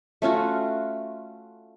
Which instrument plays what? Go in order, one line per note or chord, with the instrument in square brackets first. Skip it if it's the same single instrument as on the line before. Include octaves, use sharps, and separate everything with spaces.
[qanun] A3 C#4 F4 F#4